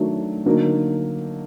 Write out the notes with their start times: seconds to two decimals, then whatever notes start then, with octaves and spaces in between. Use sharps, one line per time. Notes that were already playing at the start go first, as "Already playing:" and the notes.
Already playing: D#3 F#3 A3 D4
0.46 D3 F#3 A#3 D#4